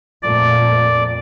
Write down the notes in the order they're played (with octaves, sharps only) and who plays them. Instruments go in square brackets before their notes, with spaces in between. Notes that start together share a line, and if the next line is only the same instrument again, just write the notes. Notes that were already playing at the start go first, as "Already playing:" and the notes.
[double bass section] F2 A#2 A3 [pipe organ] D5